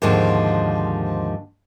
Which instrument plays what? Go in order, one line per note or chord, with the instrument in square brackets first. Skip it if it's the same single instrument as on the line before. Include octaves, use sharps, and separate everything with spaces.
[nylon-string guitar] D#2 G#2 D3 D#3 F3